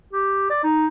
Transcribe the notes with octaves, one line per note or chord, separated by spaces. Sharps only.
G4
D5
D#4